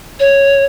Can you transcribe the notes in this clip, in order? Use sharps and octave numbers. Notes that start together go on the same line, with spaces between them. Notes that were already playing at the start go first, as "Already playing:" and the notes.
C#5